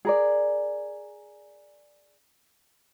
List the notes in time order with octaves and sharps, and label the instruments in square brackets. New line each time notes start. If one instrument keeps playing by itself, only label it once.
[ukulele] G#4 A#4 D5